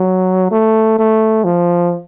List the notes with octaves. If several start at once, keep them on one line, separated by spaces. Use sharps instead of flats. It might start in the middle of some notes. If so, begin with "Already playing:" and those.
Already playing: F#3
A3
A3
F3